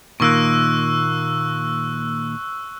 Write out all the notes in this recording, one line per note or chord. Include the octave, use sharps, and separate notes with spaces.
A#2 D#3 A#3 C#6 E6 F#6